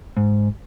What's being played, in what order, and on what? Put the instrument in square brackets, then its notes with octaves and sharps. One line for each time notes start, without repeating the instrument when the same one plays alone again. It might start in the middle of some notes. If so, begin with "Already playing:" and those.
[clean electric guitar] G#2